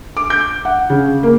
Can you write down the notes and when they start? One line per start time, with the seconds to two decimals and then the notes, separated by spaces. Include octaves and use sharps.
0.17 D6
0.30 G6
0.65 F#5
0.90 C#3
1.23 A#3